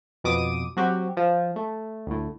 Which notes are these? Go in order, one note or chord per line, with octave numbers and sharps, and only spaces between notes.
F2 B2 D6 D#6 D#7
F#3 C4 F#4 G4
F3
A3
D2 A2